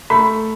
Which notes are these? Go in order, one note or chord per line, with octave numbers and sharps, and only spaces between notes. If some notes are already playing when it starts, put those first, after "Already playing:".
A3 B5